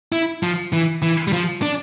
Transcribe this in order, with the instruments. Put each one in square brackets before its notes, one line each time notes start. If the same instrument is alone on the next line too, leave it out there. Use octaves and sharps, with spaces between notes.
[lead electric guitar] E4
F3
E3
E3
G3
F3
D4